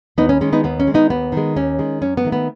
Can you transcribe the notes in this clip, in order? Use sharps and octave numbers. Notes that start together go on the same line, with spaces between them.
D#2 B3 D#4
C#4
D#3 G#3 C#4
B3 D#4
D#2 B3
C#4
D#3 G#3
B3 D#4
D#2 B3
D#3 G#3
D#2 C#4
D#3 G#3
F#2 C#4
B3
D#3 A3
B3